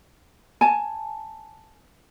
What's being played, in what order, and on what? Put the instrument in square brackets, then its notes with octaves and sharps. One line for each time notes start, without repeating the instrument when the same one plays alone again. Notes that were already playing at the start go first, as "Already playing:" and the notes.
[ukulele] G#5 A5